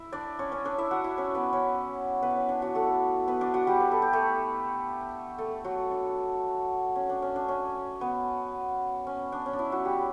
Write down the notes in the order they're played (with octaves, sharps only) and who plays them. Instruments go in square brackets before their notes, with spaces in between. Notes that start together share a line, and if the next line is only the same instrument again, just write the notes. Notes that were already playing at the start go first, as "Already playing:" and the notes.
Already playing: [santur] E4 E5
D4 D5
C#4 C#5
C#4 C#5
D4 D5
E4 E5
F#4 F#5
E4 E5
C#4 C#5
B3 B4
C#4 C#5
B3 B4
C#4
D4
F#3 F#4
A3 A4
B3 B4
D4 D5
F#4 F#5
G3 G4
B4
A4
G4
A3 A4
A3 A4
F#3 F#4
D4
C#4
D4
C#4
D4
C#4
B3
C#4
D4
C#4
D4
E4
F#3 F#4
G3 G4